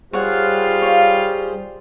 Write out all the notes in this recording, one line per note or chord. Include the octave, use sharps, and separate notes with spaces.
G3 F4 G#4 C5 C#5 F#5
C#5 F5